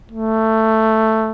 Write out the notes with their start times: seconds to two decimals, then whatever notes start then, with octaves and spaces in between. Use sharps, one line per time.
0.11 A3